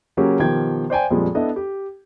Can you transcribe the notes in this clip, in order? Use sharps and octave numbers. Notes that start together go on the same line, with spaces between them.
C#3 F#3 A#3 C#4 G4
B2 D#3 F3 G4 G5 G#6
C5 D5 G5 G#5
F2 A#2 F3 G3 G#3
B3 D4 E4 A4 D#5
G4